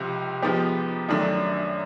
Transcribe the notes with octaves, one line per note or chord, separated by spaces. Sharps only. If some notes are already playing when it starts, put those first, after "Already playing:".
Already playing: C#2 C3 F3
F3 G#3 B3 D#4 G4
F#2 D#3 F#3 A3 D4